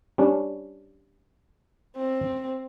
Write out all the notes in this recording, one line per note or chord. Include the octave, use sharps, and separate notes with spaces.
G3 C#4 D4
C4